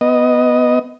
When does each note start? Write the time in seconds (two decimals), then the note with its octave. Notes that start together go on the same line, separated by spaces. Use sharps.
0.01 B3 D#5